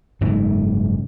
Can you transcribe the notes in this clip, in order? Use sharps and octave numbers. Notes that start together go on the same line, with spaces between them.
F#1 G#2 C#3 E3